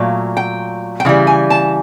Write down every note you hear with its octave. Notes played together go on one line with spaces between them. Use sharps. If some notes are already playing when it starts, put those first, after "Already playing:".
Already playing: A#2 F#3 A3 F5
G5
G5
C#3 E3 G3
G#5
A5